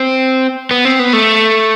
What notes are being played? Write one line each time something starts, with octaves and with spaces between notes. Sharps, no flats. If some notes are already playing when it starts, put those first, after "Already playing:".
Already playing: C4
B3
C4
B3
A3